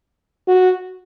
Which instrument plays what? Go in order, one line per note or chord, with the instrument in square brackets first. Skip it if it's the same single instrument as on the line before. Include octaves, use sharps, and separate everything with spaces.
[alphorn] F#4